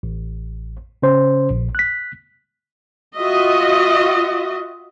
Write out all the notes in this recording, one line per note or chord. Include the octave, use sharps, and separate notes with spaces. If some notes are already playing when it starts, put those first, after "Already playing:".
A1
C#3 C#4 C5
A#1
F#6 B6
F4 F#4 D#5 E5